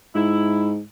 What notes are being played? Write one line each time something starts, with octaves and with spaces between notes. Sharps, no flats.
G#2 E4